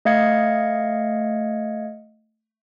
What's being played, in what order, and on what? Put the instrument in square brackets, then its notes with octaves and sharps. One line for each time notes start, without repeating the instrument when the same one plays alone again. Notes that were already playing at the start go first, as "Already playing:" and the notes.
[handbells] A3 D#5 F5 G#6 C#7